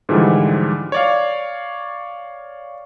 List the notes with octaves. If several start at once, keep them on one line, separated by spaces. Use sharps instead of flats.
G#2 D3 E3 F3 G3
C#5 D5 F5